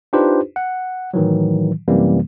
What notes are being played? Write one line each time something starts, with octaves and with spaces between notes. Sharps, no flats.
D4 D#4 F4 G4 B4 C5
F#5
A2 D#3 E3 F#3
F#2 C3 E3 G3 A#3